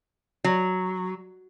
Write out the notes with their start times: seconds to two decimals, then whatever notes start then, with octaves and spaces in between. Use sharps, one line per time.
0.44 F#3